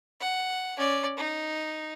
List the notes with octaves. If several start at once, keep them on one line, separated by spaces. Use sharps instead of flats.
F#5
C#4 D5
D#4